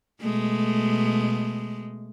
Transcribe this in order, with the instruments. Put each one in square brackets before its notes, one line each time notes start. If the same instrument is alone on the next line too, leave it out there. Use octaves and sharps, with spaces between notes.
[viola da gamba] B2 G#3 A3